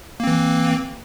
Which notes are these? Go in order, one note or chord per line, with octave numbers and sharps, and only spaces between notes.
E3 A#3 C4